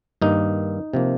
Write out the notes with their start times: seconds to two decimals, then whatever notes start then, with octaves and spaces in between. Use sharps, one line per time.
0.22 G2 D#3 A#3 D#4
0.94 C3 F3 A#3